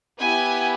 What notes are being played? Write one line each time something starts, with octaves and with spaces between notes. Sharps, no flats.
B3 E4 G4 G#5